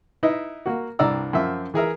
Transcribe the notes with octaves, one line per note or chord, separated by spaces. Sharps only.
D#4 E4 B4 D#5
A#3 F#4
C2 G2 D5 A#5 E6
F#2 F3 E5
E3 G#4 A#4 E5